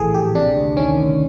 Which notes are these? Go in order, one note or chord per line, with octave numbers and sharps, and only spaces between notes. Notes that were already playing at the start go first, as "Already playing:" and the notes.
Already playing: A#1 A2 E3 G#4 A4
A#1 G4
C3 D4
D2
D#3 C#4
D2